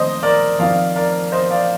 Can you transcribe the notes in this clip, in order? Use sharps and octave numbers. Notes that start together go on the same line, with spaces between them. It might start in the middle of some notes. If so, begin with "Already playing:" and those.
Already playing: F2 C3 D#3 C5 D#5
A#4 D5
F2 D#3 D5 F5
A#4 D5
C5 D#5
D5 F5